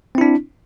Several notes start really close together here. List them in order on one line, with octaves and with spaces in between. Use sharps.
C4 E4 D4